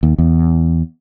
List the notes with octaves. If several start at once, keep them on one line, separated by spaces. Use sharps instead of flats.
D#2
E2